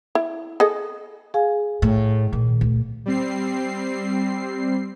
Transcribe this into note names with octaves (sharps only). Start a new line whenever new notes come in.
E4
G#4 A4 D#5
G#4 F5 G#5
A2
A#2 D#3
D2
G3 C4 C7